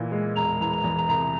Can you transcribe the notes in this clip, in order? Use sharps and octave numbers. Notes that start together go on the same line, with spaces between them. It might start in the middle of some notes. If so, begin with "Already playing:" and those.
Already playing: A#2 E3 E4
G#3
E1 A#5
E3
A#5
E2
C2 A#5